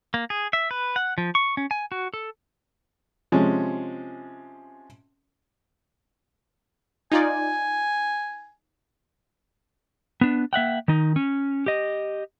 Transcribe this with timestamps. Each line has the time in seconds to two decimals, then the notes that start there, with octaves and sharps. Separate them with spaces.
0.14 A#3
0.30 G#4
0.53 E5
0.71 B4
0.96 F#5
1.18 F3
1.35 C#6
1.57 C#4
1.71 G#5
1.92 F#4
2.14 A4
3.32 C3 F3 G#3 C#4
7.12 D#4 F4 D5 G#5
10.21 B3 D4
10.53 A#3 E5 F#5 G5
10.88 D#3 D#4
11.16 C#4
11.66 G4 D#5